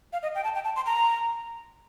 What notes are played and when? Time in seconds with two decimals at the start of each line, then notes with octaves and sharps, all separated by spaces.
0.13 F5
0.23 D#5
0.35 G5
0.44 A5
0.55 G5
0.65 A5
0.76 C6
0.86 A#5